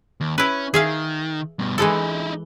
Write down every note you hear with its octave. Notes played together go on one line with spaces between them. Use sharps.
D#2
C#4 E4 B4
D#3 G#4 E5 F5
G2 B2
E3 G#3 D#4 E4 A4